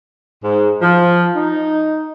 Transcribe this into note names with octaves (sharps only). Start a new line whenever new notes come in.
G#2
F3
D#4